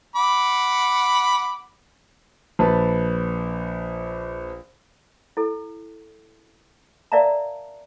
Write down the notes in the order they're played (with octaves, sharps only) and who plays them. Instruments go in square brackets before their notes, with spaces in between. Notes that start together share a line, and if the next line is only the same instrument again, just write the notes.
[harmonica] F#5 B5 D6
[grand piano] A#1 B4 A5
[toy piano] E4 A4
A#4 D5 E5 F5 A5 A#5